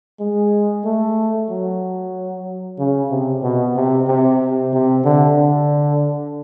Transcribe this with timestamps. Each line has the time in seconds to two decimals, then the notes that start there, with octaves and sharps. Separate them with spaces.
0.20 G#3
0.85 A3
1.50 F#3
2.79 C#3
3.11 C3
3.43 B2
3.76 C3
4.08 C3
4.73 C3
5.04 D3
5.37 D3